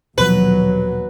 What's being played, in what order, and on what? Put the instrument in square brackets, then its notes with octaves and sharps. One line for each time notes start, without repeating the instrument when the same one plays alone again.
[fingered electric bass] D#1 B2 F3 [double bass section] D#2 F#3 [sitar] B4